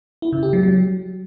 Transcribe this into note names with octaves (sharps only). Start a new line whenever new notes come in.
E4
C#3
G4
F#3
F#3